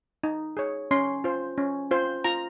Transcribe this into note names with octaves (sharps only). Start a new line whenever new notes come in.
D#4
G#4 C#5
C#4 C6
F4 C5
C#4
F4 C5
F4 A#5